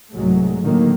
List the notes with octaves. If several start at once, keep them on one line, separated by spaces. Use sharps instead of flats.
C2 G#2 F#3 G#3 A3
A2 D3 D#3 F#3 A3 A#3